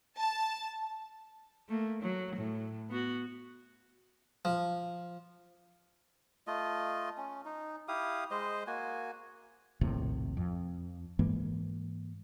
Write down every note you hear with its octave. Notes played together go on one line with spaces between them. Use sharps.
A5
A3 A#3
F#3
A2
B3 F#4
F3
A3 F4 D#5
C#4
D#4
E4 G4 F5 D#6
G#3 C5 D#5
A#3 F#4 G#5
A#1 D#2 A2 C3
F2
G#2 E3 G#3 A#3